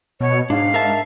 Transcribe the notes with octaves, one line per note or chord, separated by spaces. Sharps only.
B2 C#5
G#2 D4 F5
A#4 E5 A5